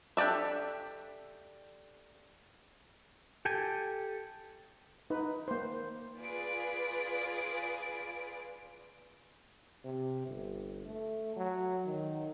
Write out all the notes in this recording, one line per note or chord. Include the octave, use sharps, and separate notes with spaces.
D4 G4 A4 D5 E5
G4 A4 G5 G#5
D#4 B4
A#3 C5
F4 G#4 B4 D5 D7
C3
G1
A3
F#3
D#3